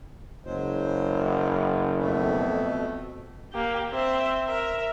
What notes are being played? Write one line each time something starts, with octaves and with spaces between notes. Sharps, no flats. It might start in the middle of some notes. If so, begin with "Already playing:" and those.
F#1 F#3 G#3 C5
F2 B2 A3
A#3 G4
C4 E5
A#4 E5